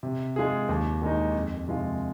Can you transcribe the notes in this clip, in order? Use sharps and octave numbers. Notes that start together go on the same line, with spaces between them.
C3
G#3 F4 G#4
D#2
D#3 G#3 D#4
F2
C3 F3 G#3 F4